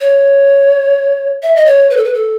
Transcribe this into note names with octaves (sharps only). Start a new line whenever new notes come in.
C#5
E5
D#5
C#5
B4
A4
B4
A4